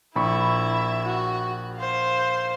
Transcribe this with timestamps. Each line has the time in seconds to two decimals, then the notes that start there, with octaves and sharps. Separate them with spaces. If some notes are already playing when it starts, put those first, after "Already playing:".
0.16 A#1 E4 E5 B5 C#6
1.05 F#4
1.76 C5 F5